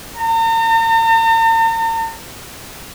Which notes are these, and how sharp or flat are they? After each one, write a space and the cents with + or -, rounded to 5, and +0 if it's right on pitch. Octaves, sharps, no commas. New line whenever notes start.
A#5 -45